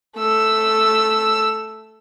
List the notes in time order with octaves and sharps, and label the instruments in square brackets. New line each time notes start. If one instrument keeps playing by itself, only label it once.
[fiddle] A3 E6